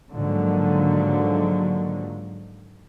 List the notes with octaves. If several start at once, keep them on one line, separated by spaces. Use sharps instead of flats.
G#2 D3 D#3 F3 F#3 A#3